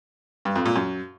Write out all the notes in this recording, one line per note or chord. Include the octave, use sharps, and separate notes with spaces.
G2
F2
A#2
F#2